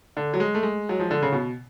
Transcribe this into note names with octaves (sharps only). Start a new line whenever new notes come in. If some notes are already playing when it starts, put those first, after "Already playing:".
D3
F#3
G#3
A3
G#3
F#3
F3
D3
C#3
B2